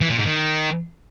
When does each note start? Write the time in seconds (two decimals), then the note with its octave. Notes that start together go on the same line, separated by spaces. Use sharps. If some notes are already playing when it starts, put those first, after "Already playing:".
0.01 E3
0.09 A#2
0.18 G#2
0.26 D#3